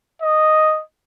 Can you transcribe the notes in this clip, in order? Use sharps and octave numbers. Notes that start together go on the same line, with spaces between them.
D#5